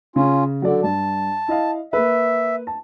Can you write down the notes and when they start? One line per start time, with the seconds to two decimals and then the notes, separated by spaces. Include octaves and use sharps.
0.16 C#3 C#4 F4
0.62 D3 F#3 D5
0.84 G2 A5
1.48 E4 D#5 F5
1.93 A#3 B4 E5
2.67 A5